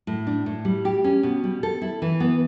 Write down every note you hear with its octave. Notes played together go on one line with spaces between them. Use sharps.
A2
D4
A2
G3
G4
C#4
B2
G3
A4
E4
E3
B3